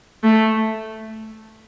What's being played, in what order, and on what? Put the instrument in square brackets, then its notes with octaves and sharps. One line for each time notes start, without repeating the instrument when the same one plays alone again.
[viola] A3